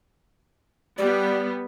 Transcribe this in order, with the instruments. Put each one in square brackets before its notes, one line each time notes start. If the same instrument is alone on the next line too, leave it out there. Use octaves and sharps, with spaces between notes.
[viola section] G3 B3 [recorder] D5